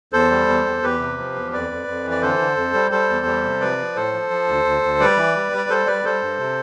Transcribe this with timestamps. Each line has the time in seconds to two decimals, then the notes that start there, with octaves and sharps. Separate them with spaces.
0.13 E2 A4 C5
0.31 G3
0.48 E2
0.66 E2
0.83 E2 G4 B4
1.00 C3
1.17 F3
1.35 E2
1.52 F2 B4 D5
1.70 F2
1.87 F2
2.04 E3
2.11 D5
2.21 D3 A4 C5
2.39 D3
2.57 F2
2.74 G3
2.91 G3 A4 C5
3.10 E2
3.26 G3
3.43 C3
3.61 F3 B4 D5
3.78 F3
3.96 A2 A4 C5
4.13 F3
4.30 F3
4.48 D2
4.65 D2
4.83 D2
5.00 G3 B4 D5
5.17 E3
5.35 G3
5.53 G3 D5
5.70 G3 A4 C5
5.87 G3 B4 D5
6.05 G3 A4 C5
6.22 G2
6.39 C3